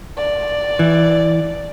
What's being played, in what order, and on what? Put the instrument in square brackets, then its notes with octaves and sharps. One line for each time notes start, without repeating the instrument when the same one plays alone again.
[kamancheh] D5
[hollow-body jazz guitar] E3